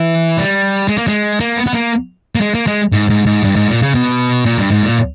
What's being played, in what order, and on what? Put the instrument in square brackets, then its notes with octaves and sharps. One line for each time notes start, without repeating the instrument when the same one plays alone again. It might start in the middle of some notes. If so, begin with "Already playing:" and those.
Already playing: [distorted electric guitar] E3
G3
G#3
A#3
G#3
A#3
B3
B3
A#3
A#3
G#3
A#3
G#3
G#2
G#2
G#2
G2
G#2
A#2
C#3
B2
A#2
G2
G#2
A#2